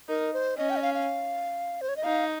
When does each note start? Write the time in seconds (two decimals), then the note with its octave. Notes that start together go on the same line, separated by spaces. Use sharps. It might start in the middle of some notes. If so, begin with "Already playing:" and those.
0.09 D#4 A#4
0.33 C5
0.57 C#4 D#5
0.70 G5
0.76 D#5
0.82 F5
0.94 F5
1.81 C5
1.89 C#5
1.97 D#5
2.04 D#4 F5